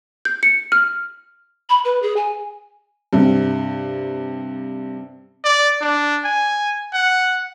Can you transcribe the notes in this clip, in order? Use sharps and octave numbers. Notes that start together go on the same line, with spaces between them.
G6
C#7
F6
B5
B4
G#4
G#5
G2 C3
D5
D4
G#5
F#5